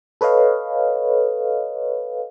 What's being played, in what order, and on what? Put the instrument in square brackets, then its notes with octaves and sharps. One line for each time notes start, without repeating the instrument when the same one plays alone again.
[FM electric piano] A4 B4 C#5 D#5 F5